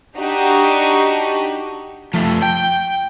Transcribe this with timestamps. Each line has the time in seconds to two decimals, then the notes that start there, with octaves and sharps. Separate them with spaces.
0.18 D4 D#4 F#4 G4
2.14 F3 A3
2.43 G5